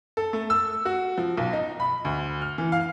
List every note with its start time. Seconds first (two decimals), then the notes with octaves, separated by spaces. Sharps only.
0.17 A4
0.33 A3
0.50 E6
0.85 F#4
1.18 F3
1.38 B1
1.53 D#4
1.80 B5
2.05 D2
2.42 F6
2.58 E3
2.72 F5